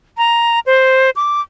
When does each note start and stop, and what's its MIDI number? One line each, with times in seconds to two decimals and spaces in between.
0.18 0.60 82
0.66 1.10 72
1.16 1.41 86